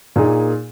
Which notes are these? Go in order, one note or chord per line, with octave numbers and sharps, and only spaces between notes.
A#2 A#3 D#4 G#4